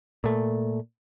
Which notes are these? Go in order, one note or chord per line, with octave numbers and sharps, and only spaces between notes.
A#2 A3